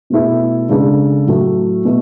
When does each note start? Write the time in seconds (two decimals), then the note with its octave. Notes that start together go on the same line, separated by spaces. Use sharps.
0.10 B2 A3 E4 A4
0.69 C#3 G#3 D4 A4
1.27 A2 F#3 A3
1.85 B2 A3